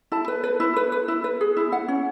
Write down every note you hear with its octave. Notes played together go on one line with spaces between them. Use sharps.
E4 A5
B4
B4
E4
B4
B4
E4
B4
G#4
E4
E4 F#5
C#4